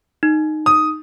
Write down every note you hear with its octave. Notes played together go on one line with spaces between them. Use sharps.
D#4
D#6